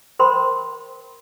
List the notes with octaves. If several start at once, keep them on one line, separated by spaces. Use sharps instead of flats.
A#4 C5 G5 B5 C6